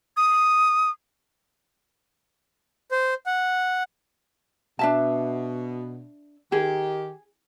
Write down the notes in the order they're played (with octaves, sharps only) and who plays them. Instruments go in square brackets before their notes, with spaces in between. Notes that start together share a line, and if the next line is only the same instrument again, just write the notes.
[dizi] D#6
[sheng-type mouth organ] C5
F#5
[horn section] B2 [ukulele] D4 E5 A5
[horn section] D#3 G4 [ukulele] G#4